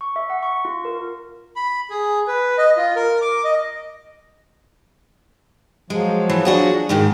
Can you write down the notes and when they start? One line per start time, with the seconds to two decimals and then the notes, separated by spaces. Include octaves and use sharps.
0.01 C#6
0.16 E5
0.30 F#5
0.43 C#6
0.65 F4
0.85 A#4
1.56 B5
1.90 G#4
2.28 B4
2.58 D#5
2.77 F4
2.96 A#4
3.21 D6
3.44 D#5
5.90 F3 F#3 G#3
6.29 E3
6.45 D4 F#4 G#4
6.89 G#2 D#3 G#3